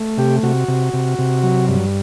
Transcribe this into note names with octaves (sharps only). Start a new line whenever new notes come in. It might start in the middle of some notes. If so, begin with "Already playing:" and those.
Already playing: A3
C3 G4
C3 F#4
C3
C3
C3
F#3
G2